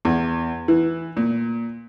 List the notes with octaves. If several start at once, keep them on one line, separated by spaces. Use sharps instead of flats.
E2
E3
A#2